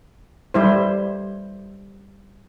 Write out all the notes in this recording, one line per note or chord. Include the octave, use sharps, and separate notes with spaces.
G3 E4 C5